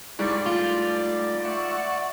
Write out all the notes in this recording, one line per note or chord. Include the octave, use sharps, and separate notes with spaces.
G#2 G3 E4 D5 G#5 C#6
A3 F4
D5 E5 F#5 C#6